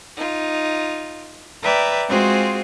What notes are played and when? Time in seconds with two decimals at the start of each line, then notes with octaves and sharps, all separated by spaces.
0.16 D#4 F4
1.65 B4 D5 E5 G5 A#5
2.10 G#3 C4 F4 F#4 G#4 C5